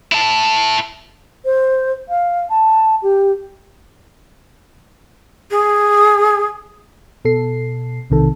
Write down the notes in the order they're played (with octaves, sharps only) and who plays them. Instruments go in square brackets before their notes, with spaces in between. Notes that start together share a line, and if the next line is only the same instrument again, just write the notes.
[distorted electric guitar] E4 A5
[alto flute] C5
F5
A5
G4
[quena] G#4
[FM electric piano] B2 A4 C7
B1 C3 D#3 A4